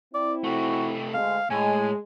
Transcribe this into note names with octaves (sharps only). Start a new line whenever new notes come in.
C4 E4 D5
C3 A3 F#4
D2 G#3 F5
A2 G#3 G#5